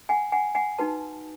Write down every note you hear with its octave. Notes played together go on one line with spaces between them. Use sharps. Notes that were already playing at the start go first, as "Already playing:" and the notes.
F#5 G#5
F#5 G#5
F#5 G#5
D#4 F#4 B4 A5